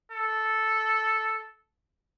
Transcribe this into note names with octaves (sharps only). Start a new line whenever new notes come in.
A4